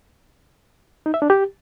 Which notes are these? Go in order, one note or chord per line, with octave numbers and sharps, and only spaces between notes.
D#4
E5
D4
G4